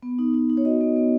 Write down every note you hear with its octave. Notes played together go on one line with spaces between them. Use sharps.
B3
D#4
D#4
D#4
C#5
F#4 D#5
B3
B3